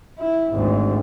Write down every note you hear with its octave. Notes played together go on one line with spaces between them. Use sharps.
E4
G#1 D2